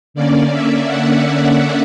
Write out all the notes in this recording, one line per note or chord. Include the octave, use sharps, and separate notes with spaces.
D3 A#3 C#4 D5
E5
F#5
F#5